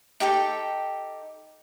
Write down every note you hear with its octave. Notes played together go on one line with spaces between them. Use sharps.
D#4 G4 A4 G5